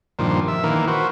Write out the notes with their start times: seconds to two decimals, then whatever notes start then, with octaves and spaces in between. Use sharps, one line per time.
0.19 G2 A#2 D#3 F3
0.48 E5
0.64 D#3 E3 A#3
0.87 F#4 B4 C5